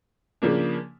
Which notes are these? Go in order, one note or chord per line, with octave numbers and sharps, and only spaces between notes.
C#3 F3 A#3 D4